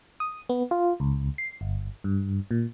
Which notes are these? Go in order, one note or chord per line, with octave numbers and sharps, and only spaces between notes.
D#6
B3
F4
C#2
C7
G1
G2
A#2